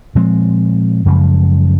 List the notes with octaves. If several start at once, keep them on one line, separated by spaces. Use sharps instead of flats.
A#2 F3 G#3 C4
F#2 C#3 F3 G#3